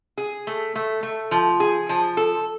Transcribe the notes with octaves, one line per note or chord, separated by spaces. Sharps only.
G#4
A3
A3
A3
F3
G#4
F3
A4